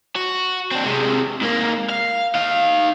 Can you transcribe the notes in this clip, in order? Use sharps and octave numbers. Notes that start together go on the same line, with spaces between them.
F#4
C4 D4
C3 G#3
G#2 A#3
F5
D#4 F5